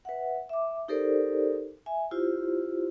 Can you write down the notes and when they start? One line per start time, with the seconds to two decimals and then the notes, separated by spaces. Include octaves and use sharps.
0.05 B4 E5 F#5
0.49 E5 D6
0.88 D#4 G4 A4 A#4 C5 D5
1.86 E5 G#5
2.11 E4 F4 G4 C5